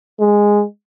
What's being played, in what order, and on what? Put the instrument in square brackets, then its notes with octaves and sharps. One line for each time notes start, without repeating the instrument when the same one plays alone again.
[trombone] G#3